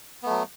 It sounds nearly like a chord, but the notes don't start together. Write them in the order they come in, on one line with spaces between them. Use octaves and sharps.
B3 A3 F#3